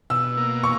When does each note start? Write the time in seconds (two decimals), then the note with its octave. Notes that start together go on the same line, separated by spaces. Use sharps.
0.10 B2 E6
0.37 A#3
0.63 C#6